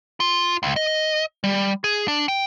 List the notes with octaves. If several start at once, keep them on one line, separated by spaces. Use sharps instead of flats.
F4
C#2
D#5
G3
G#4
D4
G5